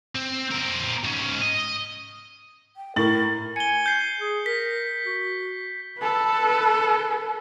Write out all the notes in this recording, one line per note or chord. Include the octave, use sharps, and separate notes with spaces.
C4
C4 A#4
G#2 C#4
D#5
G5
A2 A#4 A6 F#7
G#5 C#7 G7
G6 C7
G#4
A#4 B6
F#4
A4 B4